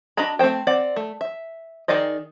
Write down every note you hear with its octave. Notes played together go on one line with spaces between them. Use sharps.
D4 F#4 D#5 A#5 B5
A3 C4 C#4 C5 G5
C4 D5 F#5
A3
E5
D#3 D#4 G#4 D5 D#5